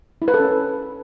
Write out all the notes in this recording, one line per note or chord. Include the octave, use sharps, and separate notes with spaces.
E4
B4
A4
C#4